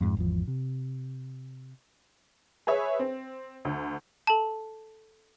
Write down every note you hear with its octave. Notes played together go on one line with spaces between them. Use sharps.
F2 G#2
G#1 E2 F3
C3
G#4 B4 C#5 E5
C4
D2
A4 A5